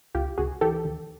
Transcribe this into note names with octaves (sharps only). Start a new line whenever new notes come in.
C#2 F4 G4
C#2 F#4 G#4
E3 G4 A4
D#2